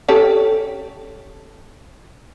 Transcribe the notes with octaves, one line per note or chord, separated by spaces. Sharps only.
C#4 G4 A4